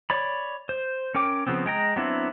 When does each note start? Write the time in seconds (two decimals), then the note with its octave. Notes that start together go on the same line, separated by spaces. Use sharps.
0.10 C#5 D5 B5
0.69 C5
1.15 C#4 A#4 G5 D6
1.47 C#3 F3 B3 C4
1.66 G#3 G5 A#5
1.96 F#3 B3 C4 D4 E4